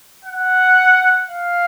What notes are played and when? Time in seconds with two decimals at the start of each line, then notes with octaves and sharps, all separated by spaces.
0.25 F#5
1.30 F5